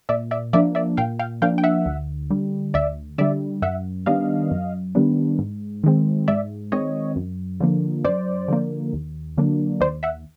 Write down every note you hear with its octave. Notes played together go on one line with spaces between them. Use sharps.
A#2 D5 E5
D5 E5
F3 A#3 D4 D5 E5
D5 E5
A#2 F5 G5
F5 G5
F3 A#3 D4 F5 G5
G5
E5 F#5
D2
D3 G3
D2 D5 E5
D3 G3 D5 E5
F#2 E5 F#5
D#3 G3 B3 D4 D#5 F5
F#2
D#3 G3 B3 D4
G#2
D#3 G#3 C4
G#2 D5 E5
D#3 G#3 C4 C#5 D#5
F#2
D3 F3 A#3
F#2 C5 D5
D3 F3 A#3
D#2
D3 F#3 A#3 D4
D#2 C5 D5
E5 F#5